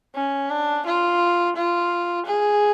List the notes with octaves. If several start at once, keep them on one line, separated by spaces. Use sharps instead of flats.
C#4
D4
F4
F4
G#4